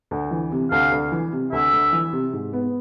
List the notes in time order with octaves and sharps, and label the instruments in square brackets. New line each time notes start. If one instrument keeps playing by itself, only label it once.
[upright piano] D2
E3
C3
[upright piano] D2 [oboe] F5
[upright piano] D2
E3
C3
[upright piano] D2 [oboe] E5
[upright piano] D2
E3
C3
G#2
B3